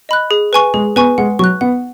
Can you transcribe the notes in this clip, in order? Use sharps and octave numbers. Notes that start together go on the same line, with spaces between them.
D#5 B5 F#6
G#4
B4 G#5 C#6
G#3 G#4
B3 B4 G#5 C#6
G#3 F#5
F#3 C#6 F#6
B3 F#5